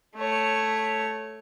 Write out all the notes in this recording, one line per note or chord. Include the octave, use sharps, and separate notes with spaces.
A3 C#5